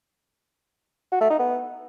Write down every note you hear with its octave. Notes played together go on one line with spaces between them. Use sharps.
F#4
A3
D#4
B3